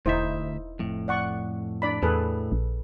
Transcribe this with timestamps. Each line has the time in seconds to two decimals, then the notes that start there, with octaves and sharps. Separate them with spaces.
0.06 E1 D2 D#4 E4 C5 E5
0.79 F2 A2
1.08 D5 F#5 C#6
1.82 D4 D5 B5
2.03 E2 A2 G#4 A4 B4
2.52 A#1